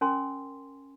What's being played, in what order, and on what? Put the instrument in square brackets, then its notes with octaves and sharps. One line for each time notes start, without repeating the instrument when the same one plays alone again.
[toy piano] C#4 A#4 G#5 C6